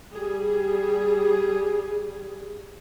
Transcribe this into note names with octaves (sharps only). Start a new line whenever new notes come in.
G3 G#4